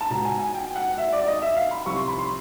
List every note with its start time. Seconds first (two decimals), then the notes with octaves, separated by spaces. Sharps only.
0.01 A5
0.10 C#2 B2 A#5
0.25 G#5
0.39 G#5
0.54 G5
0.76 F#5
0.98 E5
1.13 D5
1.23 D5
1.27 D#5
1.42 E5
1.56 F5
1.71 B5
1.85 C2 C3 F3 C#6
1.97 C6
2.08 B5
2.19 C6